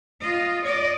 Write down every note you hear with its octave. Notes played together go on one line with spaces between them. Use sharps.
F4 D#5
D5 D#5